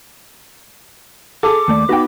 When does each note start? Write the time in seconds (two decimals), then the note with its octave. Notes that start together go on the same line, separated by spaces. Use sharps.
1.43 G#4 A4 D6
1.68 D#2 A3 D5
1.89 B3 D#4 F#4 B4 G5